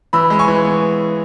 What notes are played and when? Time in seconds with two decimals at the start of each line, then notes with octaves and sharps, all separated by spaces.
0.13 E3 B5 E6
0.30 G#3 B5
0.39 G#5 C#6
0.48 E3
0.65 B3